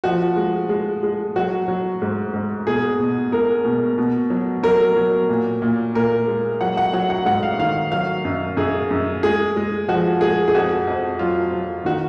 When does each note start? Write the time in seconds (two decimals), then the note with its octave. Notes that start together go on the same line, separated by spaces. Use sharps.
0.04 F3 F#4
0.36 G#3
0.69 G#3
1.03 G#3
1.36 F#3 F#4
1.68 F#3
2.02 G#2
2.34 G#2
2.67 B2 G#4
2.99 B2
3.32 G#3 A#4
3.65 B2
3.98 B2
4.30 F#3
4.63 F#3 A#4
4.96 F#3
5.30 A#2
5.62 A#2
5.95 A#2 A#4
6.27 G#3
6.61 F#3 F#5
6.77 F#5
6.93 F#3 F#5
7.10 F#5
7.25 G#2 F#5
7.43 F5
7.59 D#3 F5
7.92 F#3 F5
8.25 F#2
8.57 F#2 G#4
8.91 F#2
9.23 G#3 G#4
9.56 G#3
9.88 F3 F#4
10.21 G#3 G#4
10.48 G#4
10.54 F2 F#4
10.87 F2
11.19 F#3 F4
11.52 F#3
11.85 D#3 F#4